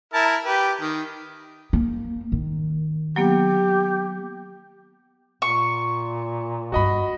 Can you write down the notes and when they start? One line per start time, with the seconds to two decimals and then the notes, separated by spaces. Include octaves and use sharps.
0.14 E4 A#4 A5
0.45 G4 B4
0.81 D#3
1.73 A#3
2.32 D#3
3.16 F#3 A#3 B3 G4
5.42 A#2 C#6
6.72 G2 F4 F#4 D#5 B5